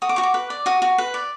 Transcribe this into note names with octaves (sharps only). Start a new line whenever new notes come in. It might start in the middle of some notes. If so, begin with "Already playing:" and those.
F#4 D#6
D6
F#4 C#6
D6
B4
D5
F#4 D#6
F#4
B4
D5